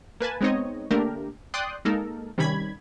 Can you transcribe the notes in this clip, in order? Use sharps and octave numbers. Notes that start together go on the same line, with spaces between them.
A#3 B4 G#5 A5
G#3 B3 C4 D#4 C#5 D#5
D3 A3 A#3 D4 G4 A#4
D5 G5 C6 D#6 F#6
G#3 A#3 D#4 A4 A#4
C3 D#3 G3 C#4 B5 G#6